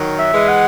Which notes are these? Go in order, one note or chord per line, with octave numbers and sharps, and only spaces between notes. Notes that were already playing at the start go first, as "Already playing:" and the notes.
Already playing: D#3 F#3
E5
E3 G#3
F#5